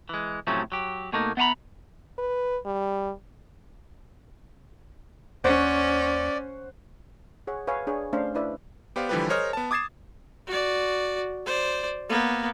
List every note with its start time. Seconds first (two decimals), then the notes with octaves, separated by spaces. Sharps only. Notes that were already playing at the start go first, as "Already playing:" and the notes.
0.09 E3 G#3
0.47 A2 C3 F3 F#3 A3 C#4
0.72 F#3 G4
1.13 B2 A3 A#3 D#4
1.37 B3 E5 F#5 G#5 A#5 B5
2.18 B4
2.66 G3
5.44 D#2 C#4 C5 D5 F#5 C#6
7.47 G#4 C#5 F#5
7.67 B4 C#5 F5 G#5
7.87 D4 G#4 C#5
8.13 A3 C#4 D4 C5 F5
8.35 D4 E4 B4 D5 E5
8.96 B3 G4 C5 D5 F5
9.09 D3 E3 F3 G3 G4 B4
9.28 G#4 A#4 C5 C#5 D#5 F6
9.53 B3 A5
9.71 D6 D#6 G#6 A6 C7 E7
10.47 F#4 D5
11.46 C5 D5
12.09 A#3 B3